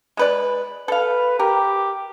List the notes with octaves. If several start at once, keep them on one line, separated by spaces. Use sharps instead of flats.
G#3 B4 D5
A4 B4 F5
G4 A#4